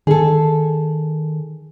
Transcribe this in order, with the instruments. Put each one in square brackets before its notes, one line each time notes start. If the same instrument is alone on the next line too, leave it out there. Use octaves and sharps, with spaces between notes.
[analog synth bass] D#3 [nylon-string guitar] G#4 A4